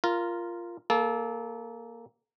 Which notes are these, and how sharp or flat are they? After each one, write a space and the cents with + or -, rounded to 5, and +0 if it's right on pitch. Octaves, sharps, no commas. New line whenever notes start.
F4 -10 A#4 +0
A#3 +0 A4 -30